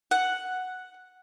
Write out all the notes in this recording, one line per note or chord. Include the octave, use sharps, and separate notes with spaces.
F#5